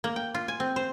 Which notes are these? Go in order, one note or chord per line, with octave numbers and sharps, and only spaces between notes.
A#3
G5
F4
G#5
C4
C5